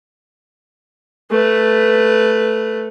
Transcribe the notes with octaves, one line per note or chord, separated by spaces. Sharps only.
A3 B4